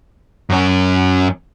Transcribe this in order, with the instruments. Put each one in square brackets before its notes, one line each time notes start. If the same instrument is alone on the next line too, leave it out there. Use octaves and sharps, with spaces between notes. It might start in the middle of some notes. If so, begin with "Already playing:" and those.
[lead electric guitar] F#2 C#4